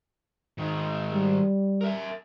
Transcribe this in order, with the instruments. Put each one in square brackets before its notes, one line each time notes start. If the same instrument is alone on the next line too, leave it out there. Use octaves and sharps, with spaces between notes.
[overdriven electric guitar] G#2 D#3
[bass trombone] G3
[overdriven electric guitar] A#4 E5